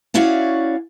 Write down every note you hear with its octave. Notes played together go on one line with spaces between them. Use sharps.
C#4 E4 F#4 C#5 D5 F5